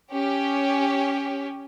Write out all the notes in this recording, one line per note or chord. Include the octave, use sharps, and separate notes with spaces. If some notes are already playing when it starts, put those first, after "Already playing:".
C#4 G4